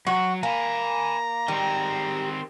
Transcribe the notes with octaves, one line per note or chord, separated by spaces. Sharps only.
F#3 F#4 C#6
A#3 G#5 A#5 B5
D#3 G3 C4